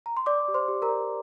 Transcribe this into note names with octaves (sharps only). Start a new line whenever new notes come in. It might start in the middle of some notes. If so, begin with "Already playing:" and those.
A#5
C6
D5 D6
G4
C5 C6
G4
A#4 A#5
D5